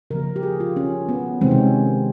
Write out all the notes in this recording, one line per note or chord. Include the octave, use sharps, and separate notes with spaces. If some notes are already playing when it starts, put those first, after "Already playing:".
C#3 F3 A#3 A#4
G4
G#4
F4
C#4
B3
C3 D#3 G#3 C4
C#4